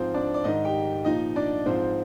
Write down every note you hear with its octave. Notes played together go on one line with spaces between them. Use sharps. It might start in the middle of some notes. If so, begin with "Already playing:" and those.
Already playing: G#2 F3 C4 C5
D4 D5
D5
G#2 D#3 D#4 D#5
G4 G5
A#2 F3 D#4 D#5
D4 D5
G#2 F3 C4 C5